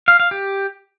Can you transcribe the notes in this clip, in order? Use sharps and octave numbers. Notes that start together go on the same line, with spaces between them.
F5
F5
G4